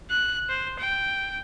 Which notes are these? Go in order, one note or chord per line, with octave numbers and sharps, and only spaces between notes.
F#6
C5
G5